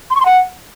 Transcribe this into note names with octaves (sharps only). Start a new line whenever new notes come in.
C6
C#6
C6
F#5